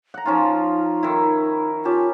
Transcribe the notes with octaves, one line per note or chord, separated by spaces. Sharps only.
F#5 A#5
F3 C#4 D#4 F4
D#3 E4
C#4 F4 G4 A5